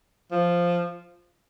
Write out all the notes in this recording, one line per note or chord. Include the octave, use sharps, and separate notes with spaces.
F3